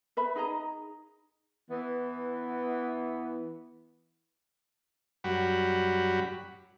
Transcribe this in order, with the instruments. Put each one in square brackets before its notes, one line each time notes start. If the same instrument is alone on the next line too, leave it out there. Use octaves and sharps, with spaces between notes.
[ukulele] B4 E5 B5
D#4 G#4 D#5 A#5
[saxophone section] E3 B3
[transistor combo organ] F#2 G3 F#4 B5